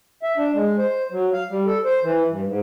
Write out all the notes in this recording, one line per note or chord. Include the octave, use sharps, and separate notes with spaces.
E5
D4
G#3
C5
F#3
F5
G3
A4
C5
E3
G2
G#2